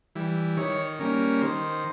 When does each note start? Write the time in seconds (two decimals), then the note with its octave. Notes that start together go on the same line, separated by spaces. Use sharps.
0.15 E3 G3
0.57 D#3 C#5
0.99 G3 A#3 C#4
1.41 D#3 C5